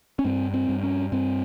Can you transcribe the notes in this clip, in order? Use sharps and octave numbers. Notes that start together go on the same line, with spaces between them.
C#4
G2 C4
C4
G2
C#4
G2 C4